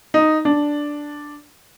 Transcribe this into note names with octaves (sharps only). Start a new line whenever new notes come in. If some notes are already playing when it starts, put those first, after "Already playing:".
D#4
D4